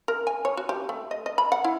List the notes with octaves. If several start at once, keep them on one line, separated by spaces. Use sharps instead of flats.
A#4
G#5
C#5
F#4
G4
A3
D#5
D#5
B5
F#5
E4